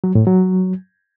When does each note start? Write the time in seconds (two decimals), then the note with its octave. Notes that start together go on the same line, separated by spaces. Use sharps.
0.04 F#3
0.15 A2
0.27 F#3